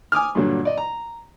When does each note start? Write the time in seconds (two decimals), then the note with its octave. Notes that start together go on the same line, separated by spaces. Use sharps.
0.12 G#5 D6 D#6 F6
0.35 G2 A#2 D3 F#3
0.65 D5 D#5
0.77 A#5